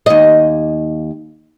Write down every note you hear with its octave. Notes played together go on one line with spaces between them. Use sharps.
D#2 D#5